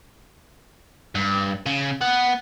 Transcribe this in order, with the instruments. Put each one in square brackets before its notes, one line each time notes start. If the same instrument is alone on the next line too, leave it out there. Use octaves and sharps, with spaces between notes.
[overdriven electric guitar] G2
C#3
B3